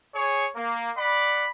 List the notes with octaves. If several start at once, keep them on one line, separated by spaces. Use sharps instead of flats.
G#4 C#5
A#3
D5 F#5 B5